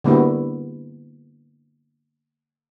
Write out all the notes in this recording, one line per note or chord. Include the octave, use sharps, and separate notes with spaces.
D3 G3 A#3 B3 E4 F#4